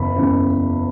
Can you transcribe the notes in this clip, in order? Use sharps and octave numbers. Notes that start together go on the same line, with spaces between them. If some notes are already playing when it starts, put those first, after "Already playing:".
Already playing: F#1 E2 C#3 B5
F#1 E2 C#3